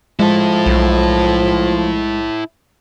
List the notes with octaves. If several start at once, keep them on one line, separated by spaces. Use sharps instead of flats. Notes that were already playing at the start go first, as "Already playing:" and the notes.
F3 G#3 E4 A4
B1